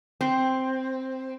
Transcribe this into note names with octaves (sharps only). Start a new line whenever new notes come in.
C4